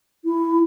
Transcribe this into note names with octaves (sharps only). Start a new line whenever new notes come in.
E4